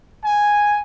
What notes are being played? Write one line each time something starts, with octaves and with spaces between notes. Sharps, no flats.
G#5